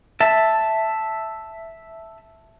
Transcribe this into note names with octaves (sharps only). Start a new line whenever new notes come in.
E5 A5